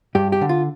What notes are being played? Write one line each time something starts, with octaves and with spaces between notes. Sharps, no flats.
G2 G4
G4
D3
F4